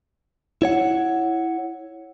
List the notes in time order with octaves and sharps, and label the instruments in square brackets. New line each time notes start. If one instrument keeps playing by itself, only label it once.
[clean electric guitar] E4 C#5 F#5